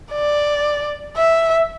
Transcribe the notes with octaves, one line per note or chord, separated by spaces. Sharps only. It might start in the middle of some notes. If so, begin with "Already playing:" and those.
D5
E5